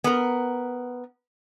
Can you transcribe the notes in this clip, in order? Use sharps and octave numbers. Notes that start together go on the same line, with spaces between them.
B3 A#4